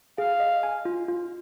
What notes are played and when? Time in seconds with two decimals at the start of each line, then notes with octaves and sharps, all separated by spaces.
0.18 G#4 F5
0.40 D#5
0.63 G#5
0.85 F4
1.08 F4